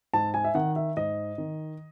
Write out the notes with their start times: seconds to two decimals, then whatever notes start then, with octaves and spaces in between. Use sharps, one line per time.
0.13 G#2 A5
0.34 G#5
0.44 E5
0.54 D#3 F#5
0.76 E5
0.97 G#2 D#5
1.38 D#3